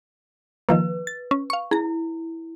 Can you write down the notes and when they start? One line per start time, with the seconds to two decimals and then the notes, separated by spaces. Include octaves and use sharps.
0.69 D#3 F3 A#3 B4
1.07 A6
1.31 C#4
1.50 F5 C#6
1.71 E4 G#4 A#5